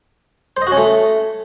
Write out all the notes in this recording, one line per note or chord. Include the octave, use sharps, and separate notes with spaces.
C5
D#5
F#4
C#4
A3